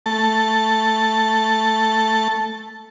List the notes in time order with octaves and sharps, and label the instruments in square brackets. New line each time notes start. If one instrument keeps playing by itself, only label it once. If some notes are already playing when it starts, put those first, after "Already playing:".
[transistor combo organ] A3 A5